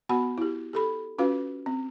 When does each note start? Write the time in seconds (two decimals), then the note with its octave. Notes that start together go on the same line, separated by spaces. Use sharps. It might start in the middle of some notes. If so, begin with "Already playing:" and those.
0.09 B3 F#4 F#5 B5
0.38 E4 G4
0.73 G4 A4 B5
1.18 C#4 F4 F#4 B4 F5
1.66 C4